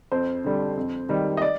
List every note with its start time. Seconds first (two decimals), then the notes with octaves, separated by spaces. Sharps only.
0.12 F2 C5
0.45 D3 G3
0.77 F2
1.09 D#3 G3
1.37 D#5
1.42 D5